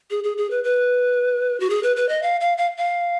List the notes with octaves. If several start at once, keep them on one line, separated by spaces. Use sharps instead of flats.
G#4
G#4
G#4
B4
B4
F#4
G#4
B4
B4
D#5
F5
F5
F5
F5